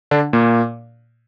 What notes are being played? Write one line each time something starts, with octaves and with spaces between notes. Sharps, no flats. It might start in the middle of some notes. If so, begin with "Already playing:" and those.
D3 D4
A#2 A#3